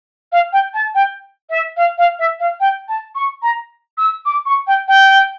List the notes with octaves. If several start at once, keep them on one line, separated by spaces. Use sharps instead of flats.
F5
G5
A5
G5
E5
F5
F5
E5
F5
G5
A5
C#6
A#5
E6
D6
C#6
G5
G5